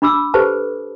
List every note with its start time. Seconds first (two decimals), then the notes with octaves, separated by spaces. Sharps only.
0.02 D4 B5 D6 E6
0.34 G4 A4 B4 C5 A5